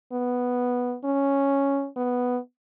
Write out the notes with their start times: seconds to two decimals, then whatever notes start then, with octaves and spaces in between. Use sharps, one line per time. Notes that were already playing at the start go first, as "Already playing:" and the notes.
0.13 B3
1.04 C#4
1.97 B3